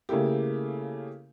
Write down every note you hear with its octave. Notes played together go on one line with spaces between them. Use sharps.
C#3 A3 A#3 E4 G4